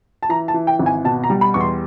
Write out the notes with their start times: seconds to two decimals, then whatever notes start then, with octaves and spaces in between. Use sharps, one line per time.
0.23 A5
0.29 E3 A#5
0.48 A5
0.54 E3
0.67 G5
0.79 G#1
0.86 G#5
1.04 B2 A5
1.24 A#5
1.30 G3
1.41 B5
1.54 E2 C#6
1.60 C6